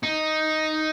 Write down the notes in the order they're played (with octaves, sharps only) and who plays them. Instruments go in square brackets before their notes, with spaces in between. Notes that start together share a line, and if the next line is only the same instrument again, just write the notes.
[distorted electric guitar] D#4